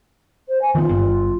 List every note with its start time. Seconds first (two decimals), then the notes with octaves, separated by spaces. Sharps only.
0.48 C5
0.61 G#5
0.75 D#3 B3 F4
0.89 G1 G2